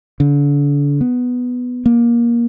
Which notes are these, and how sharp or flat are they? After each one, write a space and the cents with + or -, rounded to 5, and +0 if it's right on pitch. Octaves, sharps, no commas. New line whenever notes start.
D3 -40
B3 +5
A#3 +20